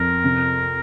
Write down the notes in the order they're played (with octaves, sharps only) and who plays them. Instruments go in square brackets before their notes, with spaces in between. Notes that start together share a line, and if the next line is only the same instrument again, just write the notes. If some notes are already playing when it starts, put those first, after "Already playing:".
Already playing: [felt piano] F2 [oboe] A#4
[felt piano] C3